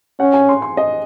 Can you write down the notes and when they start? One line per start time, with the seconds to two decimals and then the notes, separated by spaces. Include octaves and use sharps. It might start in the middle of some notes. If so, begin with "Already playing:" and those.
0.20 C#4 F#5
0.34 G#5
0.49 C6
0.62 C6
0.77 D#5